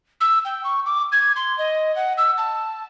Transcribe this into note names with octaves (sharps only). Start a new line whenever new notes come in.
E6
G5
C#6
D6
G#6
C6
D#5
F#5
E6
A5